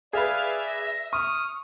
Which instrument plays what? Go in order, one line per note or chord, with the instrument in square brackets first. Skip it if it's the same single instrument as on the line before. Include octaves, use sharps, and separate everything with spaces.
[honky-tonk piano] G#4 B4 [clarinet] D5 [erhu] E5 [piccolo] F5
[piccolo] A#6
[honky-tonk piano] C#6 [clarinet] D#6 [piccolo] F6